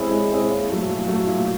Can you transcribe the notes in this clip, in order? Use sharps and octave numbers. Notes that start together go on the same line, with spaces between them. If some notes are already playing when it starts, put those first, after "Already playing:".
Already playing: G#3 C4 E4 G#4 C#5
G#3
C4 E4 G#4 C#5
A#2
F#3 A3
A#2
F#3 A3
A#2